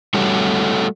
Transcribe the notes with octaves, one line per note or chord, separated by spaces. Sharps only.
G3 A3 F#4 A4 C#5